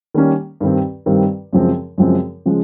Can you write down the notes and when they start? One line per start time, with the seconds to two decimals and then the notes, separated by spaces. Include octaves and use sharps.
0.14 D#3 G3 A#3 C#4
0.61 G2 D#3 G3 C4
1.06 G2 D#3 G3 C4
1.53 F#2 C#3 F3 G#3 C4
1.98 F#2 C#3 F3 G#3 C4
2.46 C#3 F3 G#3